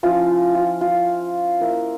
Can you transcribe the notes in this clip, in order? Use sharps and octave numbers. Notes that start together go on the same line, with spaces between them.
F3 C#4 E4 F4
F4
F4
A#3 E4